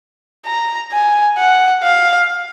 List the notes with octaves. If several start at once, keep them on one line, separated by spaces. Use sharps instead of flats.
A#5
G#5
F#5
F5